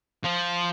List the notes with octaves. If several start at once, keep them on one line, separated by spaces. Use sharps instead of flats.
F3